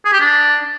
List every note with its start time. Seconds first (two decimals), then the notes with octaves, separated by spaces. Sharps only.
0.05 G#4
0.13 G4
0.21 D4